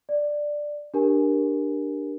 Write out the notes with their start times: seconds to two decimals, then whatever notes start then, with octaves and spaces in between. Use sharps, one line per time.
0.09 D5
0.94 D4 G4 A#4 G#5